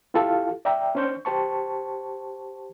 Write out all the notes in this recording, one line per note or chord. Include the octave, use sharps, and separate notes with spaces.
E4 F4 G4 A4 F5
D5 E5 G5 A#5
C#4 D4 C5 C#6 G6
G4 C5 A5 C#6